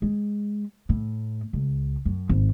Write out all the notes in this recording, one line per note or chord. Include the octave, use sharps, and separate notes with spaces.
G#3
A2
C#2
F#2
G#1